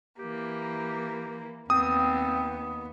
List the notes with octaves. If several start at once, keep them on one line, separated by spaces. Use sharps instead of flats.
E3 A#3 G4
D#2 B3 C4 D#6